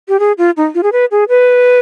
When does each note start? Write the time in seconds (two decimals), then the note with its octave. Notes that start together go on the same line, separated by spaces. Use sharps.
0.08 G4
0.20 G#4
0.38 F4
0.57 D#4
0.75 F4
0.83 G#4
0.93 B4
1.11 G#4
1.29 B4